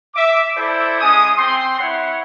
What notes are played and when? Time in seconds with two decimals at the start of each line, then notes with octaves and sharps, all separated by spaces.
0.14 E5 D6
0.55 E4 A4 C5 D5 E5
1.01 G#3 C#4 G#5 D#6
1.37 C4 C6
1.79 E4 C#5 F#5